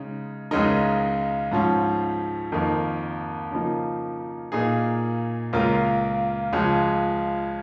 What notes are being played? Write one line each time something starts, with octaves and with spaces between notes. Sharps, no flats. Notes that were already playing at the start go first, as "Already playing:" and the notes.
Already playing: C#3 G#3 D#4
C#2 C#3 G#3 D#4 A#4
G#2 F3 C#4
F2 D#3 A#3 D#4
C#3 F3 A#3 D#4
A#2 A#3 D#4 G#4
C#2 C#3 A#3 F4 A#4
C#2 C#3 F3 G#3